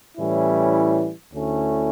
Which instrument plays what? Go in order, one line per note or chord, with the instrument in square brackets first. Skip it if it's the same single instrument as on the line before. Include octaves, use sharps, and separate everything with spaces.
[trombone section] A2 E3 G3 C#4 E4
D2 D3 A3 C#4 E4